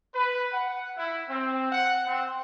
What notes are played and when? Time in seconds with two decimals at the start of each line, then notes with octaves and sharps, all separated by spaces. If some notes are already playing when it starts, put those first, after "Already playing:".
0.14 B4
0.52 F#5
0.96 E4
1.28 C4
1.70 F#5
2.06 C4